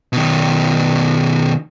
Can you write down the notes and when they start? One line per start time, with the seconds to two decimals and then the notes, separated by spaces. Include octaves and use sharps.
0.13 B2 D#3